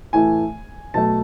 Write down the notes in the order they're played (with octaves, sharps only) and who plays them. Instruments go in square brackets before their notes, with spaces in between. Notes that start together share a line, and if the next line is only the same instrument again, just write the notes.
[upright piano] A2 E3 A3 G#5
B2 F#3 A3 A5